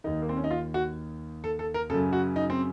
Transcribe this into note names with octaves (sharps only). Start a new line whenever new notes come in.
D#2 D#3 D#4
A#3
C4
C#4
D#4
F4
F#4
A4
A4
A#4
F#2 C#3 A4
F#4
D#4
C4